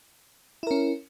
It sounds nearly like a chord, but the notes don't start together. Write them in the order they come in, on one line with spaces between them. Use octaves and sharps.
E4 A#4 C#4